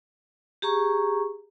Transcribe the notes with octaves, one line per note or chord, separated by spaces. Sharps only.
G4 G#4 A#5 C#6